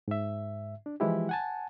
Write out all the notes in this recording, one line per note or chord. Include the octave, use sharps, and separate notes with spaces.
G#2 E5
D4
E3 F3 G#3 E4 G4
F#5 G#5 A5